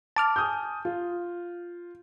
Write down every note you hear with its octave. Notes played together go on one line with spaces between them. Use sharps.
A5 D6 F6
G#5 D#6 G6
F4